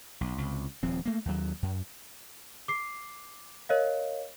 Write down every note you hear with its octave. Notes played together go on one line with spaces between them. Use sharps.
B1
C#2 C3
D#1 F3 C4
A3 A#3
D#2 F#3
F#2
D6 C7
A#4 C#5 D#5 F5